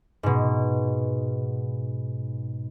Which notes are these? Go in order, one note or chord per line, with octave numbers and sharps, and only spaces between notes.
G#2 B2